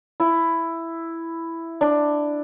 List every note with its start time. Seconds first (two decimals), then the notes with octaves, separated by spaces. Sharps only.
0.20 E4
1.81 D4